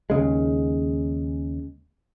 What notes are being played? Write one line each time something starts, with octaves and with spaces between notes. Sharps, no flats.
D#2 C#3 G#3